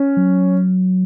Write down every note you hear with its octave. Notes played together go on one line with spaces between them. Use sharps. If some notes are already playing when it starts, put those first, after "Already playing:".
Already playing: C#4
F#3